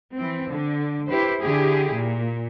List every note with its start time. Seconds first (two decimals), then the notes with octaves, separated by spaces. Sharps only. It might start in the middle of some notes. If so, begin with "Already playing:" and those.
0.15 E3 C4
0.49 D3
1.07 E4 G4 B4 C5
1.40 D3 E4 G4 G#4
1.93 A#2